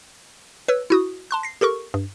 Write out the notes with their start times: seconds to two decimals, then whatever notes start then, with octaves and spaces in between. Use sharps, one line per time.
0.68 B4 C#5 E6
0.90 E4 F#4 D#6
1.31 A5 C6 F#6
1.43 A#6 C7
1.61 G4 A4 A#4 C#6
1.94 G2